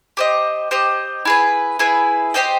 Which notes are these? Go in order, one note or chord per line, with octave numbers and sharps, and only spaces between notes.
G4 C5 D#5
G4 C5 D#5
E4 G#4 B4
E4 G#4 B4
G4 C5 D#5 G5